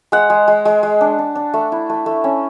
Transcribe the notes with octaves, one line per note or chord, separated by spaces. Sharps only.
G#3 F#5
G#3
G#3
G#3
G#3
D4
D4
D4
A3
E4
A3
A3
C#4